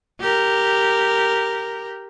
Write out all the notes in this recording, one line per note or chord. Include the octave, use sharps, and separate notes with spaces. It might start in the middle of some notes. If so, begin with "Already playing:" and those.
G4 A#4